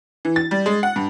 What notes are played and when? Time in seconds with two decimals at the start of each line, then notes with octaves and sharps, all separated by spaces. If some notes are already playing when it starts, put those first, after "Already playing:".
0.25 E3
0.36 A6
0.51 G3
0.66 G#3
0.83 F#5
0.96 G2